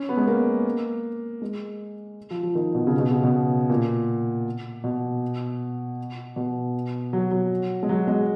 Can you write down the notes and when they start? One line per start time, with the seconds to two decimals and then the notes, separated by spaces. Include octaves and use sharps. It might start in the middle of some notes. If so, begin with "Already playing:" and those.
Already playing: C#4
0.09 B3
0.17 G#3
0.27 A#3
1.42 G#3
2.31 F3
2.43 F3
2.55 D#3
2.75 B2
2.87 C#3
2.99 B2
3.11 C#3
3.24 B2
3.69 A#2
4.84 B2
6.36 B2
7.13 F#3
7.31 F#3
7.83 G#3
7.89 F#3
8.07 G#3